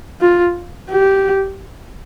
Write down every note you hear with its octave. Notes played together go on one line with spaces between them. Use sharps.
F4
G4